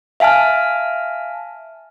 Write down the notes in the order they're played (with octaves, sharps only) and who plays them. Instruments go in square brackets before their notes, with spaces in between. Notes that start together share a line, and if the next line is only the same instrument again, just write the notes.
[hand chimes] E5 F5 G#5 A5 F6